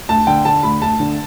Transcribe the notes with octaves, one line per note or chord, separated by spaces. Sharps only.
D2 A5
D3 G5
D3 A5
D2 B5
D2 A5
D3